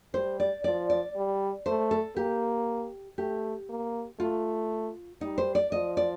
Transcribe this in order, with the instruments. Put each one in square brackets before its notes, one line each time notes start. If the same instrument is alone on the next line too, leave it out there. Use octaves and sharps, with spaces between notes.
[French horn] G3 [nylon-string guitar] C5
[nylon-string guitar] D5
[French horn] F3 [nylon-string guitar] D5
[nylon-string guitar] D5
[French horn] G3
[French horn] A3 [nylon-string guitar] C5
[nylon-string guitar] A4
[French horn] A#3 [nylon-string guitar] G4
[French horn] A3 [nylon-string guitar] G4
[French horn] A#3
[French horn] A3 [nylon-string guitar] F4
[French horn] G3 [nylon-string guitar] D#4
[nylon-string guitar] C5
D5
[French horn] F3 [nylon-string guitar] D#5
[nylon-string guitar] D5